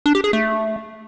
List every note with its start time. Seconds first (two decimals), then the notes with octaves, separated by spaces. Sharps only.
0.06 D4
0.15 G4
0.24 G#4
0.33 A3